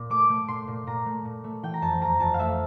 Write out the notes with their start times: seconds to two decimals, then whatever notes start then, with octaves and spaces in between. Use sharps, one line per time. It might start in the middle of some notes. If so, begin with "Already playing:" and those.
Already playing: A#2
0.10 A3 D6
0.29 A3
0.48 A#2 C6
0.67 A#2
0.87 A#2 A#5
1.06 A3
1.25 A#2
1.44 A3
1.63 E3 G5
1.74 A#5
1.82 F2 A5
2.01 F2 A#5
2.20 F2 A5
2.34 F5
2.39 A3 E5